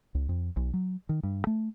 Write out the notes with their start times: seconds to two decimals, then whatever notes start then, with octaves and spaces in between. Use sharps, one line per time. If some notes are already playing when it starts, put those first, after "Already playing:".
0.15 C#2
0.29 F2
0.56 B1
0.74 F#3
1.09 D#3
1.23 G2
1.47 A3